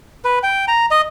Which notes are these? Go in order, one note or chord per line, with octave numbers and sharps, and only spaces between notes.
B4
G5
A#5
D#5